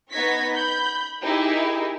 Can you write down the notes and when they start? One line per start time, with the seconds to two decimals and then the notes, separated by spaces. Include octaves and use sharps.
0.12 B3 D#4 C#6 G#6 A#6 B6
0.55 B5 G6
1.24 D#4 E4 G4 G#4 A#4 E5